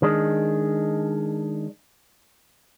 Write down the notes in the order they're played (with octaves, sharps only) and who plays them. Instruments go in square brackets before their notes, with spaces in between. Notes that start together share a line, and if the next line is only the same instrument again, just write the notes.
[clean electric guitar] D#3 G#3 D4